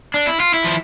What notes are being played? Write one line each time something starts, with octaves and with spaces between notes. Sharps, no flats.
D4
E4
F4
E4
F3